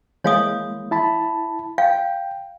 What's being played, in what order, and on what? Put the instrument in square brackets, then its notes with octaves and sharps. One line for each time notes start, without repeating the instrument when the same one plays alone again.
[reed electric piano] E3 G#3 A#3 [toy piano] C#5 F5 D#6
[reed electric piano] E4 A5 B5
[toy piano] F5 [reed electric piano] G5